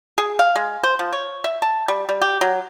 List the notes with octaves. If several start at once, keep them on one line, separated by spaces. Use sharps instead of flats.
G#4
F5
G#3
C5
F3
C#5
E5
A5
G3
G3
G4
F#3